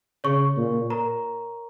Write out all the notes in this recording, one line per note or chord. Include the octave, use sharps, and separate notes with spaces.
C#3 C#5 C#6
A#2
A#4 A#5